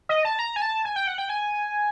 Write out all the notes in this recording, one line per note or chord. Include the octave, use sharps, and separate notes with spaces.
D#5
A5
A#5
G#5
A5
G#5
G5
F#5
G5
G#5